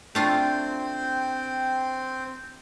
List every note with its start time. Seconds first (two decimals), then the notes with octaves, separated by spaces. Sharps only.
0.15 A3 C4 D4 F4 G5